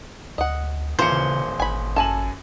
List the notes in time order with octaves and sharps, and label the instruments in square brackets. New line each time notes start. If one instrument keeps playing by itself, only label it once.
[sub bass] D2 [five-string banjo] D#5 F#5
[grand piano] D#1 E3 C#7 [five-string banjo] F4 A#4 [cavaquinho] C5
[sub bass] C#3
[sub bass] G#1 [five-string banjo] G#5 B5
[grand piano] F#2 G#5 F#7 [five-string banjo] A4 A5